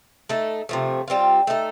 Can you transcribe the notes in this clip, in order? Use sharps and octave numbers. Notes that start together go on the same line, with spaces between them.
A3 D#4 A4
C3 F3 A3
G3 C4 F4
A3 D#4 A4